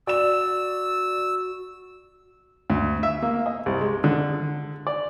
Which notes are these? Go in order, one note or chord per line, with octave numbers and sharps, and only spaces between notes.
F#4 D5 E6 E7
D2
E5
A#3
D#5
C2
G#3
D3
D5